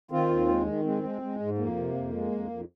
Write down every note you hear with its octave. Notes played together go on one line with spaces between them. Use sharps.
D#3 C4 F4
D#2
G#3
D#3
G#3 C4
G#3
G#3
G#2
F2 A#3
C3
F2
G#3
F2
F2